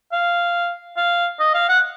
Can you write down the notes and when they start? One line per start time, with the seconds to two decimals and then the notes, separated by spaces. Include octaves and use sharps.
0.12 F5
0.97 F5
1.39 D#5
1.54 F5
1.69 F#5